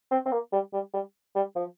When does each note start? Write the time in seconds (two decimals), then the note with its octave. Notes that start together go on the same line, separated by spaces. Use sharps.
0.12 C4
0.26 C4
0.32 A#3
0.53 G3
0.73 G3
0.94 G3
1.36 G3
1.56 F3